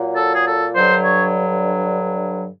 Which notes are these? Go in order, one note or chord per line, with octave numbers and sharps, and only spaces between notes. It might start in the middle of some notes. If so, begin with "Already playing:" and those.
Already playing: A#2 F#3
A4
G#4
A4
G2 D3 F#3 C5
C#5